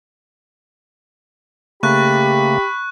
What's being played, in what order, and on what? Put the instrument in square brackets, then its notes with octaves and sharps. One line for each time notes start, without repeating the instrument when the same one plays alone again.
[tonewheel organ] C#3 A3 A#3 [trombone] G4 [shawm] B5 [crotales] C#6 F#6